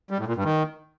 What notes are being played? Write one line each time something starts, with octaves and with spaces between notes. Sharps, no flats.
G3
A2
A#2
G2
D#3